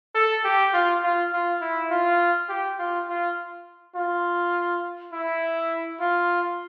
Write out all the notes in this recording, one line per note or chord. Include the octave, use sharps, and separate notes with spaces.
A4
G4
F4
F4
F4
E4
F4
G4
F4
F4
F4
E4
F4